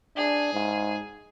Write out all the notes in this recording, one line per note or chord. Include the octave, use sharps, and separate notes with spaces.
D4 G#4
G#2